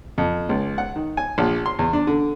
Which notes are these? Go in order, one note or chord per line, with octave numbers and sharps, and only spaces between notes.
F2
C#2
F#5
D#3
G#5
A#1
C6
E2
D4
D3